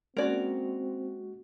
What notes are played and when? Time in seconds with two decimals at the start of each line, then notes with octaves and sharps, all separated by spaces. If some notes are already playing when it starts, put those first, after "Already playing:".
0.17 G#3 A#3 C4 C#4 F#4 A#4 D5